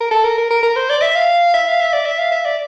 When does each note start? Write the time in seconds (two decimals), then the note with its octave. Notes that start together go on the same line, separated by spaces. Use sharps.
0.01 A#4
0.11 A4
0.24 A#4
0.38 A#4
0.50 A#4
0.63 A#4
0.76 C5
0.89 D5
1.02 E5
1.15 F5
1.54 E5
1.68 F5
1.80 E5
1.93 D5
2.06 E5
2.19 F5
2.32 E5
2.45 D5